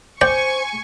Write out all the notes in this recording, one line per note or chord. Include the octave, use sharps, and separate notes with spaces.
C5 D5 G5 G#5 C#6 G6